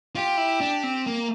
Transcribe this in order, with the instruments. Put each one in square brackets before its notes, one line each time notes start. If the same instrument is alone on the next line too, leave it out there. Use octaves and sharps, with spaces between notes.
[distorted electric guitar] F4 [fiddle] G4
[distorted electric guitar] E4
D4
C4
A#3